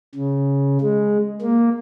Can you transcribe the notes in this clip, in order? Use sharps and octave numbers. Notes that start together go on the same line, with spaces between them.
C#3
G#3
A#3